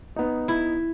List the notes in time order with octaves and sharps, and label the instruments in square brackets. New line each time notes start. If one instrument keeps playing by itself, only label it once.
[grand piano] B3 D#4
[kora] E4